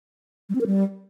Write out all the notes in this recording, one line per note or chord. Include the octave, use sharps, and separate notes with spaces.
G3
C4
A#4
G3